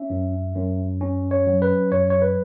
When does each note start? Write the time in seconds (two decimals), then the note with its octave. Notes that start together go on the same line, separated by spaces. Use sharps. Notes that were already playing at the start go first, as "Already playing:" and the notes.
Already playing: C#4 E5
0.10 F#2
0.56 F#2
1.01 C#4
1.31 C#5
1.47 F#3
1.62 B4
1.92 F#2 C#5
2.10 C#5
2.22 B4